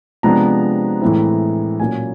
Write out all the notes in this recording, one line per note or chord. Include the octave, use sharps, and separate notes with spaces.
C3 F3 G#3 B3 D4 A#5
A2 E3 G#3 C4 E4
A#2 F#3 A#3 C#4 G#5